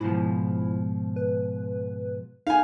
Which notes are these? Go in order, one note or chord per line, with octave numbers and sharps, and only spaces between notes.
G#2 B2 F3 E4
B4
D#4 F5 G#5